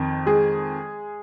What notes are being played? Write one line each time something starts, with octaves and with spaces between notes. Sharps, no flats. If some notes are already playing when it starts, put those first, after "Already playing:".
Already playing: F2 D#3
G#3 G#4